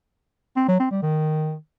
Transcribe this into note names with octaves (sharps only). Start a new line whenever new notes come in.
C4
F#3
C4
G3
D#3